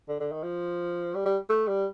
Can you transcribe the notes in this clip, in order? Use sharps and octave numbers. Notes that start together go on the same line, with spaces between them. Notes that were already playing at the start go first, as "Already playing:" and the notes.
D3
D3
D#3
F3
G3
G3
A3
G3